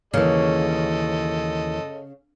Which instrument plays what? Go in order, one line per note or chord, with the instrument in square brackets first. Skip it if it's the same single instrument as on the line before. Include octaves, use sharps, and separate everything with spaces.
[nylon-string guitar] D#2 E3 [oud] C#3 [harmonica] A4 D#5